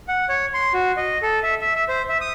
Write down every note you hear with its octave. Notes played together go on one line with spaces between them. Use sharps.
F#5
C#5
C6
F#4
D#5
A4
E5
E5
E5
C5
E5
D#6